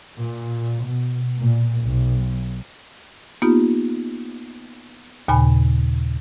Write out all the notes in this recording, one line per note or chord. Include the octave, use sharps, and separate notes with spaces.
A#2
B2
A#2
B1
A#3 B3 D#4 F4 G4
D#2 A#2 C#3 G#5 B5